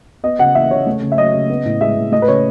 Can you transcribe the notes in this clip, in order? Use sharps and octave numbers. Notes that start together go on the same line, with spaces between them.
B3 D#5
C#3 F#5
E3 E5
C#3 C#5
A3
C#3
E5
F#3 D#5
C#3
B3
A2
G#3 E5
A2
A3 D#5
B4
C#3 C#5